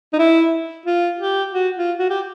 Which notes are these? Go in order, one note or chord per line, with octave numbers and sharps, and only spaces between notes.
D#4
E4
F4
G4
F#4
F4
F#4
G4